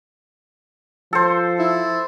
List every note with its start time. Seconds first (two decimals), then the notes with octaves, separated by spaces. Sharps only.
1.13 F3 A4 C5
1.59 E4